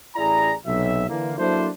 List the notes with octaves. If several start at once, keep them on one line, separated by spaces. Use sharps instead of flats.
A1 E4 G#4 D5 A#5
B1 C3 F#3 E5
D3 E3 A#3
F#3 A#3 D4 E4 A4 C5